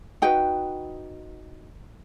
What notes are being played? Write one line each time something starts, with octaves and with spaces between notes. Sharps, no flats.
D#4 F#4 B4 G5